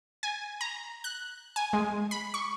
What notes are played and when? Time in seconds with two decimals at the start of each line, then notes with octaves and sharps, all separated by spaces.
0.23 G#5
0.61 A#5
1.04 F#6
1.56 G#5
1.73 G#3
2.11 B5
2.34 C#6